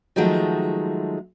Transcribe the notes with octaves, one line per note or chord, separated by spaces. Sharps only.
D#3 F3 F#3 G#3 A3